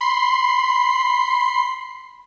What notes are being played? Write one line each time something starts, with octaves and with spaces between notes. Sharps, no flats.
B5 C6 C7